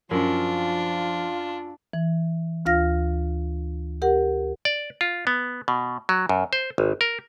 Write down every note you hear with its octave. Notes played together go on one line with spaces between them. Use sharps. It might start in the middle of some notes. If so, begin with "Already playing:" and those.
F#2 F3 D4 F4
E3
D2 F4 F5 F6 A#6
G4 A#4 F#5
D5
F4
B3
B2
F#3
F#2
C5
G#1
A#4